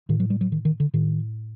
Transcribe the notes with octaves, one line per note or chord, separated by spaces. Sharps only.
A2 D#3
F#3
G3
F#3
D#3
D#3
D3
A2 D#3